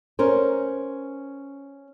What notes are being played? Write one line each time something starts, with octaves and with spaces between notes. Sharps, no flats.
C#4 A#4 C5